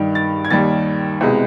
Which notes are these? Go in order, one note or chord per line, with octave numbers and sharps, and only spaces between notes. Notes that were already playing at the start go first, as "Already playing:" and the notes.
Already playing: G2 D#3 G3
A6
G#6
D#2 D#3 G3 A6
C2 B2 G#3